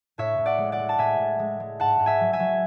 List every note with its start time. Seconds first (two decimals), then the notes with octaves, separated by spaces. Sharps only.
0.18 A2 C#5 E5
0.38 A2
0.46 D5 F#5
0.58 G#3
0.72 D5 F#5
0.79 G#3
0.89 A5
0.98 A2 E5 G#5
1.19 A2
1.39 G#3
1.60 G#3
1.80 G#2 F#5 A5
1.99 G#2
2.06 E5 G#5
2.20 F#3
2.33 E5 G#5
2.40 F#3